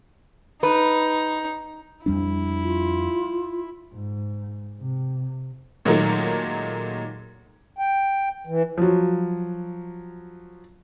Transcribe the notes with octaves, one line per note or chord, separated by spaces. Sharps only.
D#4 B4
F2 G3 D4 E4
F4
G#2
C3
A#2 D#3 F#3 G#3 A3 A#4
G5
E3
F3 F#3